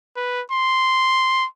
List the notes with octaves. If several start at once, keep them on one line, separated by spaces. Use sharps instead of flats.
B4
C6